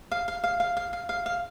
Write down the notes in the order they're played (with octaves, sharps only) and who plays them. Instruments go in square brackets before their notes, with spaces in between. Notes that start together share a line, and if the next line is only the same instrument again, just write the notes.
[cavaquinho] F5
F5
F5
F5
F5
F5
F5
F5